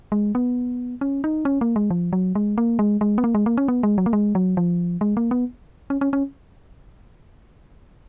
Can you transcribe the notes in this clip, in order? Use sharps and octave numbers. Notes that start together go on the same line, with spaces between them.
G#3
B3
C#4
D#4
C#4
A#3
G#3
F3
F#3
G#3
A#3
G#3
G#3
B3
A#3
G#3
A#3
C#4
B3
G#3
F#3
A#3
G#3
F#3
F3
G#3
A#3
B3
C#4
C#4
C#4